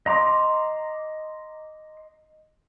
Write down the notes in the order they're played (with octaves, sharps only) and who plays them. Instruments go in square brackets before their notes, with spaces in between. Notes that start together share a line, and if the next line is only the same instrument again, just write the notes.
[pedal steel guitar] D#5 A#5 C6 D6